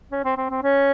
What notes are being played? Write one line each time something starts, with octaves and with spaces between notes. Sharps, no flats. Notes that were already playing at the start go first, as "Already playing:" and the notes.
C#4
C4
C4
C4
C#4